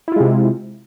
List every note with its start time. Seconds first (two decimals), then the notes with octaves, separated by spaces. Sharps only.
0.08 E4
0.12 F4
0.16 G#3
0.20 C3